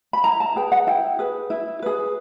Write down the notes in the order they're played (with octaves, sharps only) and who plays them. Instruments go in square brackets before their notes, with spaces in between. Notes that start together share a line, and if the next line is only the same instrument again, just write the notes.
[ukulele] B5
E4 A#5
A5
G#4 B4 G5
F#5
E4 G5
G#4 B4
E4
G#4 B4